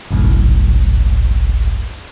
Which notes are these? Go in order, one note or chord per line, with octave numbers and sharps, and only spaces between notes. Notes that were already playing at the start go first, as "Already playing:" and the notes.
G1 C2 F#2 A2